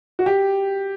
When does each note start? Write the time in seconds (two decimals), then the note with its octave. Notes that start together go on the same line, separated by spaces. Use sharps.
0.19 F#4
0.26 G4